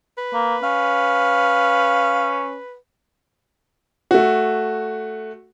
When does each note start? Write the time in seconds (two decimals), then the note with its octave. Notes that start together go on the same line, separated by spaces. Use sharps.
0.18 B4
0.34 A#3
0.63 C#4 F5
4.11 A3 F#4